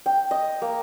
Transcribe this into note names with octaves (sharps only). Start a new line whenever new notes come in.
G5
D#5
A#3